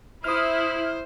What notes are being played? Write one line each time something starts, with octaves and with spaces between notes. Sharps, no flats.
E4 C5 D#6 F6